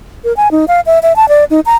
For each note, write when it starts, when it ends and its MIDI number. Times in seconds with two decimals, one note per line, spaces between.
0.24 0.35 70
0.37 0.51 80
0.51 0.65 63
0.68 0.81 77
0.86 0.99 76
1.03 1.16 76
1.16 1.28 81
1.29 1.44 74
1.50 1.60 63
1.66 1.77 82